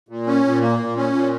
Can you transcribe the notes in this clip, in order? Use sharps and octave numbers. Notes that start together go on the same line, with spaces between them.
A#2
C#4
A#2
A#3
A#2
C#4
A#2